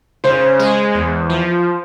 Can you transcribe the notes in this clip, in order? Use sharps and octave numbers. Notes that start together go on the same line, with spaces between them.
C#3 C5
G#3
E2
F3